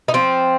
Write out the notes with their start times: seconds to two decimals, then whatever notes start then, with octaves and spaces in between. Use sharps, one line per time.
0.08 D#4
0.14 F3 C4